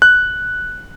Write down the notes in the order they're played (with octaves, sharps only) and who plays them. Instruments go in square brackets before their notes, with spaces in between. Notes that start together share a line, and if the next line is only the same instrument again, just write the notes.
[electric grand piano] F#6